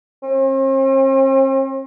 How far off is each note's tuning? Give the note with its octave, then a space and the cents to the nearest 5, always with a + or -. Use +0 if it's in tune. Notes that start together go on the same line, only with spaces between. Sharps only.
C4 +45